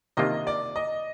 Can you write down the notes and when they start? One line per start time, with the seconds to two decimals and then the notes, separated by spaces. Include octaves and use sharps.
0.17 C3 D#3 A#3 D4 F4 D#5
0.47 D5
0.76 D#5